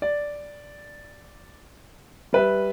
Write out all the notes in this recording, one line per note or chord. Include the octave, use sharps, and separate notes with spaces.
D5
G3 B4 E5